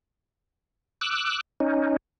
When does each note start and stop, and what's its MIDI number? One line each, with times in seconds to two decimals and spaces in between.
1.01 1.41 86
1.01 1.41 88
1.01 1.41 90
1.60 1.96 61
1.60 1.96 63